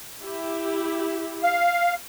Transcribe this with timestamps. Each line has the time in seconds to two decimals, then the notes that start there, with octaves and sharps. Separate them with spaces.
0.21 E4 G4
1.43 F5